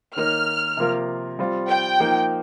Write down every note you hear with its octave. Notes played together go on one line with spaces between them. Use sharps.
D#3 A#3 D#4 A#4 C#5 F6
C3 F3 A#3 F4 A#4
G3 C4 F4
G5
F3 A#3 D#4